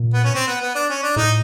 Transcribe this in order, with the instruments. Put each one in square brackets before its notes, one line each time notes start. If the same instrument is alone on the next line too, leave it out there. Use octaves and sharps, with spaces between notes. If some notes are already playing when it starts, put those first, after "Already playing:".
Already playing: [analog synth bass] A#2
[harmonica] B3
C#4
C4
B3
B3
D4
C#4
D4
[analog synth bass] A2 [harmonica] D#4